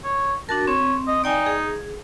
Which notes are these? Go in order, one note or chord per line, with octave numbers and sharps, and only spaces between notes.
C#5
D4 F#4 A#4 A5
C4 C#5
D#5
D#4 D5 G5 G#5
G#4